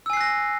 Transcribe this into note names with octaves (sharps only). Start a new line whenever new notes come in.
G#5 E6 F#6 A#6 C7